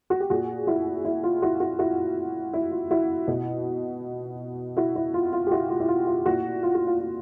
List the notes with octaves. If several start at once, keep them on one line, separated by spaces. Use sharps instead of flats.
F#4
G4
A#2 F#4 G#4
E4 F#4
E4
F4
E4 F#4
E4 F#4
E4 F#4
E4
F4
E4 F#4
B2
E4 F#4
E4
F4
F4
G4
E4 F#4
F4
E4
F4
F4
A#2 E4 F#4
F4
F#4
F4
F4